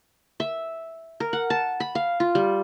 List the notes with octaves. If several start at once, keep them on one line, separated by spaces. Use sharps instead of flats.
E5
A#4
F#5
A5
B5
F5
F4
G3